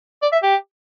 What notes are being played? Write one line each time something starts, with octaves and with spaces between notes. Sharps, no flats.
D5
E5
G4